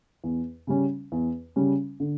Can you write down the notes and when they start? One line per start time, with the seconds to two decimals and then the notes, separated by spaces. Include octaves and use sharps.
0.24 E2
0.67 C#3 G3 C#4
1.12 E2
1.56 C#3 G3 C#4
2.00 D3